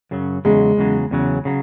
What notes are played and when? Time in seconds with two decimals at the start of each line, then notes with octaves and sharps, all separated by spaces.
0.11 F#2 C#3 F#3
0.45 E2 C#3 F#3 G#3
0.77 E2 C#3 F#3
1.11 E2 C#3 F#3
1.45 C#3 F#3